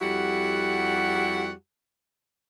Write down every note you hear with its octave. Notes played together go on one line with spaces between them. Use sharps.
F2 G3 E4 F#4 G4 F#5